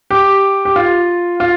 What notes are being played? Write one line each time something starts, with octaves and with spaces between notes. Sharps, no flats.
G4
G4
F4
F4